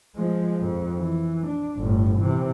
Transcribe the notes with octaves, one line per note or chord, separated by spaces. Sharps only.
F3 G#3
F2
E3
D4
G1 A2
C3 E3